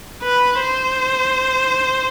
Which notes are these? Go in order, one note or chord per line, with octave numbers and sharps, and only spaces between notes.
B4
C5